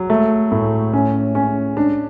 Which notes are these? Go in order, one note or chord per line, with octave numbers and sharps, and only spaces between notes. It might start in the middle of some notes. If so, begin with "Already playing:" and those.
Already playing: F#3
A3
A2
C#4
C#4
D4